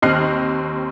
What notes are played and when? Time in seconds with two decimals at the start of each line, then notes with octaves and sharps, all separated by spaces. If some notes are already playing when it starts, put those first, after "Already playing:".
0.02 D#2 C4 D#5 F6 F#6 C7